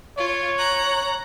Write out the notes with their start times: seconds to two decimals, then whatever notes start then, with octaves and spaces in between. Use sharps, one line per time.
0.18 F4 C#5
0.59 A#5 F#6